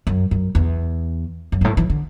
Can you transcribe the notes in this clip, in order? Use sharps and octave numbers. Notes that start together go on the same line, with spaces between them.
F#2
F#2
E2
F#2
G2
A2
E3
D3